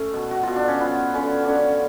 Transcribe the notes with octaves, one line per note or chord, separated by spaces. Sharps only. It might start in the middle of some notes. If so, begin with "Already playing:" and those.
Already playing: A3 C#4
B2
F#4
B2 F4
D4
C#4
F3 B3
D3 C#4
D3 C#4 D4